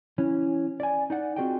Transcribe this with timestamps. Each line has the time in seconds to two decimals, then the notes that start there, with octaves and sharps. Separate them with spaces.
0.18 E3 C#4
0.80 D5 G#5
1.10 D#4 D5 F#5
1.36 C4 F4 F#4 G#4 D#5 G5